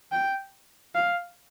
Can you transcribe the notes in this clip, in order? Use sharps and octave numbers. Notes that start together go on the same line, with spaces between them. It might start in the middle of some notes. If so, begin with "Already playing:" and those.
G5
F5